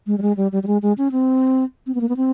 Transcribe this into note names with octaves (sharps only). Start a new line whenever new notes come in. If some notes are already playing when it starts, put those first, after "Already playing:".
G#3
G3
G#3
G3
G3
G3
G#3
G#3
C#4
C4
C4
B3
A#3
B3
C4